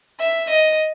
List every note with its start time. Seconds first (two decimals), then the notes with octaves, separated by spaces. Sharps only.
0.20 E5
0.49 D#5